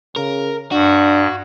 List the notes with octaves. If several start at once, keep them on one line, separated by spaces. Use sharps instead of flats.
C#3 A#4
G2 D4 F#4